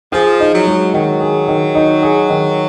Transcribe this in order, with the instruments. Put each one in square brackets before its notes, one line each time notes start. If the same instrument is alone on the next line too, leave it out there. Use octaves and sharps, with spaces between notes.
[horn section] F3 [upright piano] G#4
[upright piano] D#4
[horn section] F#3
[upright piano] G#3
[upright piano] D#3 [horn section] F#3
[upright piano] G#4
D#3
D#4
G#4
D#3